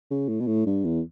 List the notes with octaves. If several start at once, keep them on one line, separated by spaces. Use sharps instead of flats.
C#3
A2
B2
A2
G2
E2